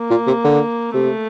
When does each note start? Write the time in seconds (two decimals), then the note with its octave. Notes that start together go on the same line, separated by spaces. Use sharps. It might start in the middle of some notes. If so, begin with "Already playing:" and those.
Already playing: A#3
0.11 A#2
0.27 C3
0.44 D3
0.94 C3 A3